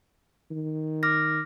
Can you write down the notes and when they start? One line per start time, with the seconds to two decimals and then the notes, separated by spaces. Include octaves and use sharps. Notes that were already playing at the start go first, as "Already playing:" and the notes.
0.51 D#3
1.03 D6 F6 A#6